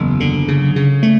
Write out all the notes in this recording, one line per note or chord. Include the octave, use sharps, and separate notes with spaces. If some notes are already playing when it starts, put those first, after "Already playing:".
Already playing: F#1 E2
D3
C#3
C#3
A3